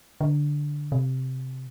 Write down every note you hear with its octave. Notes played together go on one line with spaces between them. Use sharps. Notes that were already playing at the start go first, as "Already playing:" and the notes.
D3
C3